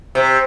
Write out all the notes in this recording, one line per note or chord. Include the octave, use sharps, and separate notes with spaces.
C3